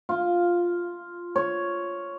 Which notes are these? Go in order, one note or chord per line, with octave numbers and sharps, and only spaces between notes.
F4
C#5